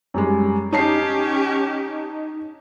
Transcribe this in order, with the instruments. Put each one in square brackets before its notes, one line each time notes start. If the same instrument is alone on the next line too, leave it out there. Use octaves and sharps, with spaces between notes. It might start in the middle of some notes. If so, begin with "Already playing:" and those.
[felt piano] F#2 G3 G#3
[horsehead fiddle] C#4 G4 [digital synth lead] D#4 [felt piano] C#5 A5 C7